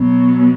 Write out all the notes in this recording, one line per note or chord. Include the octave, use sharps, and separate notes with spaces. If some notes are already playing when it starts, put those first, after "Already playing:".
Already playing: B2 F#3